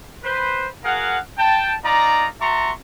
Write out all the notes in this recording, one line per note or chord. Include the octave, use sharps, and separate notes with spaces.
B4 C5
F#4 G#4 A#4 F5 F#5
G5 A5
D#4 F4 D5 A#5
F#4 E5 A5 A#5 C6 C#6